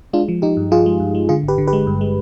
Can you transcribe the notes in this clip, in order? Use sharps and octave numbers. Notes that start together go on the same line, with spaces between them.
G#3 D4 F4
F3
F3 D#4 G4
G2
F3 F4 G#4
G#3
G2
G#3
D3 F4 G#4
G#1
G4 B4
D3
G4 B4
G#3
G2
G#3